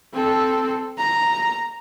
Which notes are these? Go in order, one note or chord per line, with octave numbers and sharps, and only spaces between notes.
C4 A4
A#5